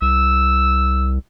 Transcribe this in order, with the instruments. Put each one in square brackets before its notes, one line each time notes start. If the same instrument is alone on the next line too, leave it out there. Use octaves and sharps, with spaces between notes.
[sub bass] C2 [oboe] E6